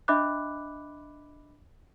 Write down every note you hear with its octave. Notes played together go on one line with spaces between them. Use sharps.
D4 D#5 E5 B5 D6 F#6